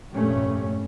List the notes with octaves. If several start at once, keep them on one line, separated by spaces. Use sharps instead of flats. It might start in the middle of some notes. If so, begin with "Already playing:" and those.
F1 G2 A#2 G3 A3 C#4